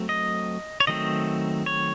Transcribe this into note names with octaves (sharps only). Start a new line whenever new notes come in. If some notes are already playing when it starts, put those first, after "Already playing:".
Already playing: F#3 A3 C4
D#5
C#5
D#3 F#3 A3 C4 D#5
C#5